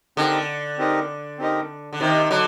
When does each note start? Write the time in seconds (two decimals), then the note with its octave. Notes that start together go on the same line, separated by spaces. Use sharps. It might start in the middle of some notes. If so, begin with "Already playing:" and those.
0.17 D3 C4 D#4 G4 A#4 D#5
0.77 C4 D#4 G4 A#4 D#5
1.39 C4 D#4 G4 A#4 D#5
1.93 D3
2.00 C3 D#3 C4 D#4 G4 A#4 D#5
2.31 D3 F#3